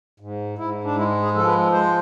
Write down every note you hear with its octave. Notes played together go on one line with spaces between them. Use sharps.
G#2
G#2 E4
D4
G#3 E4
G#4
F3 A4
B4
G#3 C5